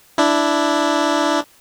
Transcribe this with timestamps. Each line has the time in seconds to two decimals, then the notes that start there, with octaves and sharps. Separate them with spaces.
0.18 D4 E4